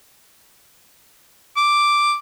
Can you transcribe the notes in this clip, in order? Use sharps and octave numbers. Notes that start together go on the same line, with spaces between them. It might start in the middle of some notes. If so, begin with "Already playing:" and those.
D6